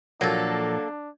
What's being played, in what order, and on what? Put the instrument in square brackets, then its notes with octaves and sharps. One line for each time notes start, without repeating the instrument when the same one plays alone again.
[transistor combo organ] A#2 F3 [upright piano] F#3 [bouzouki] A#3 A4 [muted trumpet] D4